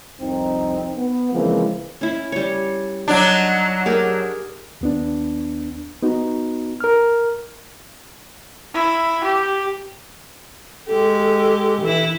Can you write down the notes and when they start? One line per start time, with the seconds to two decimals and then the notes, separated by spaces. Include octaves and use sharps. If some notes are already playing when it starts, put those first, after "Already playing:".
0.20 C2 F2 C4 D#4
0.98 B3
1.32 C#3 E3 F3 G#3 A#3 C4
2.01 C#4 E4
2.32 G3 C#5
3.08 F#3 D4 D#4 D5 A#5
3.86 G4 G#4 A#4
4.81 D#2 B3 D4
6.03 B3 D#4 F#4
6.81 A#4 F6
8.74 E4
9.24 G4
10.88 G#3 G4 A4
11.81 E3 E4